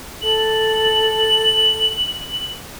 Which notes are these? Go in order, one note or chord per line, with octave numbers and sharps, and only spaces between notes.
A4 F#7